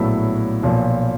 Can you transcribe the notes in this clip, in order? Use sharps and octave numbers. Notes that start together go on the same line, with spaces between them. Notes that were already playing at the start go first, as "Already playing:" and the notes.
Already playing: A#1 A2 F#3 B3 E4
B1 A#2 F3